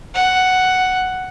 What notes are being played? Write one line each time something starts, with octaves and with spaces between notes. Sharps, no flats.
F#5